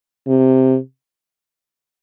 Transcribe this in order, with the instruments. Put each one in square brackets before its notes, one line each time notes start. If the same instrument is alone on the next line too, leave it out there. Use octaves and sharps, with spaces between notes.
[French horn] C3